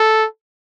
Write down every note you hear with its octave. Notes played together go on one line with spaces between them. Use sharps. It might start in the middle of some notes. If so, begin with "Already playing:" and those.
Already playing: A4